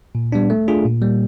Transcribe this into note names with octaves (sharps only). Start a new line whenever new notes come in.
A#2
G3 B3 D4
A3
D4 F4 G#4
A#2
G3 A#3